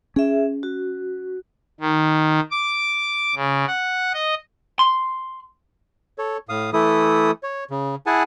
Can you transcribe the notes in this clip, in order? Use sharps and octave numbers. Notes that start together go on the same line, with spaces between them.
C#4 G#4 E5
F#4
D#3
D6
C#3
F#5
D#5
C6
A4 C#5
A2 F5 D#6
E3 A3 E4 A4 D#6
C#5
C#3
E4 G#4 F#5 G#5 A5